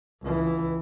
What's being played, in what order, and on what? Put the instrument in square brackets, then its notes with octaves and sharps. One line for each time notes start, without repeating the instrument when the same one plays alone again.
[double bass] C#2 E3